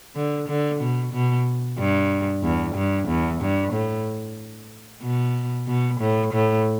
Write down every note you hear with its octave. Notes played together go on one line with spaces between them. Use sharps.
D3
D3
B2
B2
G2
E2
G2
E2
G2
A2
B2
B2
A2
A2